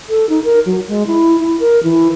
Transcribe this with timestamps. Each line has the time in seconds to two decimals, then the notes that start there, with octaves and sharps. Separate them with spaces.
0.10 A4
0.29 D#4
0.44 A#4
0.66 F#3
0.88 G#3
1.07 E4
1.40 E4
1.60 A#4
1.84 E3